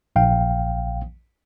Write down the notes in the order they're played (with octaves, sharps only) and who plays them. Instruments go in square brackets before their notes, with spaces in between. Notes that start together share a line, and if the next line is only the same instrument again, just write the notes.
[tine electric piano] A#1 F5 G5